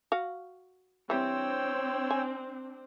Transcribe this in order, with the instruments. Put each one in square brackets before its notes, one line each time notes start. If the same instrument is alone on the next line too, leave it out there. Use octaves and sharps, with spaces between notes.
[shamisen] F#4 F5
[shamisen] E3 G3 [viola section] C4 D4 [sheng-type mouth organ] C#5 G5 E6
[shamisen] G#5